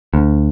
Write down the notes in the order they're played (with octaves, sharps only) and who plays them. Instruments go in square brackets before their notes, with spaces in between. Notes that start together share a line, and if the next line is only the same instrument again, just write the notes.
[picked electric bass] D2